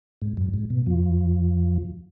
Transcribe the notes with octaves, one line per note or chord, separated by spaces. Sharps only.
G#2
F#2
G#2
B2
F2 F3